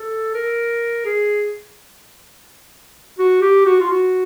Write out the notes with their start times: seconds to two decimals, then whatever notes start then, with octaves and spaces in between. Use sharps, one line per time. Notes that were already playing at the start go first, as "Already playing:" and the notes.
Already playing: A4
0.34 A#4
1.05 G#4
3.19 F#4
3.41 G4
3.66 F#4
3.81 F4
3.90 F#4